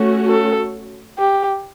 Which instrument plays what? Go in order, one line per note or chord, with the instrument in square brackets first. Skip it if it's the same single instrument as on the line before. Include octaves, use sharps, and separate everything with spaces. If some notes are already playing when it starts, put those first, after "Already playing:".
Already playing: [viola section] A3 C#4 F#4
[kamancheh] A4
G4